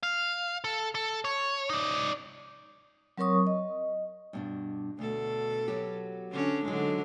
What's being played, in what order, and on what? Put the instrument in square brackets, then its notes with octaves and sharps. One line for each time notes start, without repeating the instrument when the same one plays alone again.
[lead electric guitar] F5
A4
A4
C#5
D#4 D5
[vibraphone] F#3 C4 A#4 C#5 C#6 D#6
D#5
[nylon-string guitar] G2 B2 D4
[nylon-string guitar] D2 [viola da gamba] B2 A4
[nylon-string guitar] F#3 B3 G4
[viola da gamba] D3 C#4 D4
[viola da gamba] D3 G#3 [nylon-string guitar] F#3 D#4